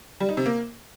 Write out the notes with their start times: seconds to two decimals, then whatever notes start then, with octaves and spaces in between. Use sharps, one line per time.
0.20 G3
0.29 D#4
0.37 C3
0.46 A#3